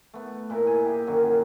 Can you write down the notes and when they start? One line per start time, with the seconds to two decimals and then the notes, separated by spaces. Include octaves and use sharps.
0.14 A3 B3
0.50 A#2 E4 E5 A#5
0.67 G#5
0.85 G4 G#4 E5
1.07 F#2 D3 D#3 F#3